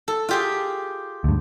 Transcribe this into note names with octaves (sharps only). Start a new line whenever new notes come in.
A4
F4 G4 G#4
D2 G2